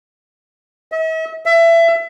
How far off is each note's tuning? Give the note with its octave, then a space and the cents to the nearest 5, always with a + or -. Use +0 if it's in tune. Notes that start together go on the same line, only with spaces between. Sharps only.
E5 -45
E5 +25